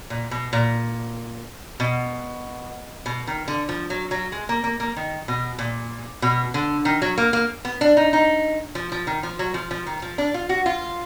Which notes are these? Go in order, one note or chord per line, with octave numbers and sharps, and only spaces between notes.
A#2
B2
A#2
B2
B2
D#3
D3
F3
F#3
F#3
G#3
A#3
A#3
A#3
D#3
B2
A#2
B2
D3
D#3
F#3
A#3
A#3
B3
D4
D#4
D#4
F3
F3
D#3
F3
F#3
F3
F3
D#3
F3
D4
F4
F#4
F4